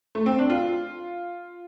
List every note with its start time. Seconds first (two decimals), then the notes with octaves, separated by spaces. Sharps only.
0.15 A3
0.26 C4
0.39 D4
0.50 F4